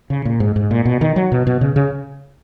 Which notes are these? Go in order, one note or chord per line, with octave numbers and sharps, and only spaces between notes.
C#3
A#2
G#2
G#2
A#2
B2
D#3
F#3
B2
B2
C#3
C#3